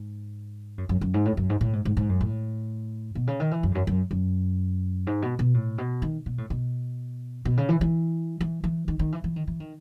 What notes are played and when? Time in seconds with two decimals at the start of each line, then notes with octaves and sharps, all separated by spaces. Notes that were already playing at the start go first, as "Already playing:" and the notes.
Already playing: G#2
0.78 F#2
0.89 F#2
1.01 F#2
1.14 G#2
1.25 A2
1.37 F#2
1.50 G#2
1.61 A2
1.73 G#2
1.85 G#2
1.97 G#2
2.09 F#2
2.21 A2
3.15 B2
3.27 C#3
3.40 D#3
3.51 E3
3.63 F#2
3.72 E2
3.75 F#2
3.87 F#2
4.11 F#2
5.07 G#2
5.22 B2
5.39 B2
5.54 A2
5.78 B2
6.02 D#3
6.26 B2
6.38 A2
6.50 B2
7.45 B2
7.57 C#3
7.69 E3
7.81 E3
8.41 E3
8.64 E3
8.88 D#3
8.99 D#3
9.12 E3
9.24 E3
9.36 D#3
9.47 E3
9.60 D#3